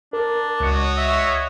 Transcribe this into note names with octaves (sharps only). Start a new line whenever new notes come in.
D4 A#4
C#2 F#4 C#5 D#5 C#7
E5